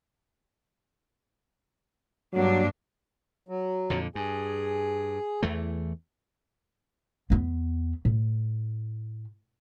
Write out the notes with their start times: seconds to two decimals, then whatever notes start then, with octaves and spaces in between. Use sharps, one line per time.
2.34 G2 F#3 A#3 D4
3.49 F#3
3.90 F2 A#2 D3
4.15 G2 G#4
5.43 E2 E3 A3
7.30 E2 B3
8.05 A2